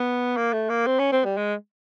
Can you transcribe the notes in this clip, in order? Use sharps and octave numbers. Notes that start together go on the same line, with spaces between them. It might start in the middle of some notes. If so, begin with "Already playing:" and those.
Already playing: B3
A#3
A3
A#3
C4
C#4
C4
G3
G#3